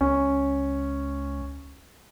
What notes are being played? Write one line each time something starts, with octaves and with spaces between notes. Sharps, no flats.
C#2 C#4